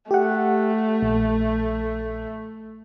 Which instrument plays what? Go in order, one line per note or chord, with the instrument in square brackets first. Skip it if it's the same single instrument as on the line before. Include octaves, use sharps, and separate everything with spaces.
[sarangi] A3 [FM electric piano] G4 F#5
[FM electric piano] A#1